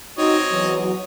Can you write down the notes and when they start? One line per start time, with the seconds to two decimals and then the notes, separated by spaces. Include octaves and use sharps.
0.18 C4 D#4 F#4 C#5 D#5
0.52 E2 E3 F#3